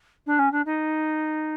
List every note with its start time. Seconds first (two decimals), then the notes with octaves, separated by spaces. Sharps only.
0.26 D4
0.39 C#4
0.52 D4
0.66 D#4